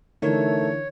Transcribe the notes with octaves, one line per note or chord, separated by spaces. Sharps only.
D3 E3 A3 D#4 A#4 C#5